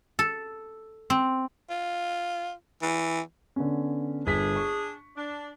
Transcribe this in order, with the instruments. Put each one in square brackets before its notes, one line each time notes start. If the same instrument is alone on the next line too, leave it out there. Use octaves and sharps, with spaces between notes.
[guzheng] A4
C4
[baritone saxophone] F4
E3
[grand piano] D3 B3 C#4
[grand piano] G1 B6 [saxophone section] D4 G#4
[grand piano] C#6
[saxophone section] D4